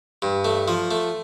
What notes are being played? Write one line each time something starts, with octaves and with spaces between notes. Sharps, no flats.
G2
A3
F3
A3